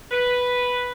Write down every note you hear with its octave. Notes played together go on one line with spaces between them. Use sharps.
B4